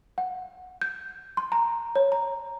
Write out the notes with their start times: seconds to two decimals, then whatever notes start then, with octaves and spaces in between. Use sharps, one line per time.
0.18 F#5
0.82 G6
1.37 C6
1.52 A#5
1.96 C#5
2.12 A#5